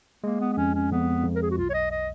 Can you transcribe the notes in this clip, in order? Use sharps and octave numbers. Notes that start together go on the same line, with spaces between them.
G#3 A#3
B3
B3
F2 C#4
C#4
F2 B3
F2
A#4
G#4
F#4
B1 F4
C#5
D#5
D#5